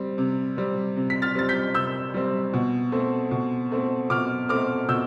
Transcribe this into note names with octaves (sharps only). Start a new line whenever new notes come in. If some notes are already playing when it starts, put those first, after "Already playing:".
Already playing: G3 C4
C3
G3 C4
C3
B6
F6 A6
G3 C4 A6
G6 B6
C3 E6 G6
G3 C4
B2
A3 C4
B2
A3 C4
B2 D6 F6
A3 C4 D6 F6
B2 E6 G6